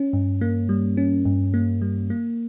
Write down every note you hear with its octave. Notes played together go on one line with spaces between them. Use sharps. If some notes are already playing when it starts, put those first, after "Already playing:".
Already playing: C#4
G2
A#3
G3
C#4
G2
A#3
G3
A#3